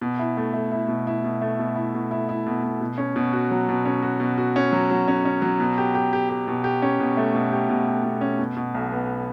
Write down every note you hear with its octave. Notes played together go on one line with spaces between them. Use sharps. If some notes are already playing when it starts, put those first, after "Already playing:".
B2
E4
A3
A3
E4
B2
E4
B2
A3
B2
E4
B2
E4
E4
B2
B2
B2
C#4
B2
F#4
F#3
B2
C#4
F#4
B2
F#4
C#4
F#3
F#3
C#4
C#4
F#3
B2
G4
G4
G4
G4
B2
G4
C#4
B2
A3
B2
G4
B2
G4
B2
C#4
B2
B2
B1
B3